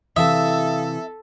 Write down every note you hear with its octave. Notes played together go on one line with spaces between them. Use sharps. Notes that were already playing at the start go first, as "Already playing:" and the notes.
C3 E3 A4 E5 F5 D#6